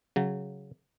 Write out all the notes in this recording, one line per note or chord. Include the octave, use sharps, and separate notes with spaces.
C#3 F#3